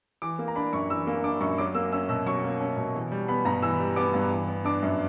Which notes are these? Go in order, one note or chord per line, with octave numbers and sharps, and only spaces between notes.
E3 D6
A#3
A#5
D4 B5
F#2 C#6
E3 E6
A#3
D4 D6
F#2 C#6
F#3 D6
A#3 E6
C#4 E6
B2 E6
F#3 C#6
A#3
C#4
B2
E3
G3
B3 B5
G2 A#5
E3 E6
G3
B3 D6
G2
E3
B3
D4 D6
F#2